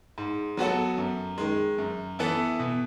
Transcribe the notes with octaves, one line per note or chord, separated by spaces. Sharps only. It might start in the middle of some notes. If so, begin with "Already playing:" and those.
G#2
F#3 B3 F#4 A4
F#2
D#3 G#3
F#2
E3 B3 E4 A4
B2